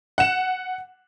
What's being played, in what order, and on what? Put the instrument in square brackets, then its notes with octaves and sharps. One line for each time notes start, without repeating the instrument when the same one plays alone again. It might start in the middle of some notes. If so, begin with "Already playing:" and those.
[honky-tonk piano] F#5 E7